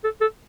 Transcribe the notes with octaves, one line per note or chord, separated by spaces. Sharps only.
A4
A4